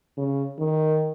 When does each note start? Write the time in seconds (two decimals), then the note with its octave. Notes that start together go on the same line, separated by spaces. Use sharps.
0.17 C#3
0.59 D#3